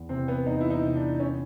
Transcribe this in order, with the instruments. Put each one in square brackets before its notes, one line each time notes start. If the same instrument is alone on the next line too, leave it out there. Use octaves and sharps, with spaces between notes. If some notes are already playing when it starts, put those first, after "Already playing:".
Already playing: [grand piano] E2
[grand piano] C3 E3 [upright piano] C4
[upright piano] B3
[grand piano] E2 [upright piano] D#4
[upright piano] E4
D#4
[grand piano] C3 E3
[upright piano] D4
C#4